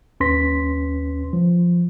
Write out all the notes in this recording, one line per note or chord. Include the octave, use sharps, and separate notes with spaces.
D#2 C#4 B4 C6 A#6 B6
F3